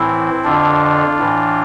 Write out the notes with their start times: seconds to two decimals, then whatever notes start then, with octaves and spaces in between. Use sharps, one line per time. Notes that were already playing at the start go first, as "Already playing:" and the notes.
Already playing: A2 E3 C4 E4
0.44 F2 D3 D4 F4
1.18 A2 E3